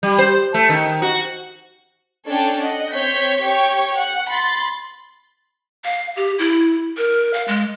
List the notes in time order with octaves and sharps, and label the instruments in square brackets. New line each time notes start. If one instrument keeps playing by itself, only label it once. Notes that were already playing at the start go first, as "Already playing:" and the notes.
[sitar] G3
C5
A3
D#3
F#4
[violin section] C#4 D4 A4 C#5 G5
D#5 F#5
C4 C#5 G6 B6
G4 C#5 C#6
F#5
B5 C6 A6
[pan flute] F5
G4
E4
A#4
F5
G#3